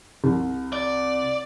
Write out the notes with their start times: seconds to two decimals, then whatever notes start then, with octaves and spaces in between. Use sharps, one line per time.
0.24 C2
0.73 D5